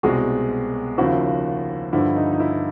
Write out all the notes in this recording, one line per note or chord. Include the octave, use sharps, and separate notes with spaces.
C2 B2 G#3 C4 F#4 G#4
D#2 C#3 F3 E4 F#4
G2 D3 F3 E4
D#4
D#4
E4